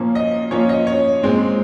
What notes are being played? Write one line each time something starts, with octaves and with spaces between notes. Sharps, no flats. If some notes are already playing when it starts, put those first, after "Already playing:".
Already playing: A#2 F3 A#3 C#4
D#5
A#2 F3 A#3 C#4 C#5
D#5
C#5
A#2 G#3 C4